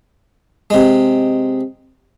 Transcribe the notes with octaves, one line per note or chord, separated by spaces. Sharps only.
C3 G#3